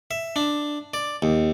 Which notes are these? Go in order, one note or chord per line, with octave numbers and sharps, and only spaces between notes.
E5
D4
D5
D#2